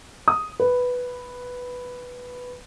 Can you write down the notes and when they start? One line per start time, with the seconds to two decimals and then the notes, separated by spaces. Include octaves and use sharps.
0.28 D#6
0.60 B4